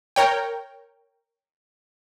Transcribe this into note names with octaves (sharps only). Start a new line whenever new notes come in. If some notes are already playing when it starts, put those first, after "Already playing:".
A#4 C#5 G5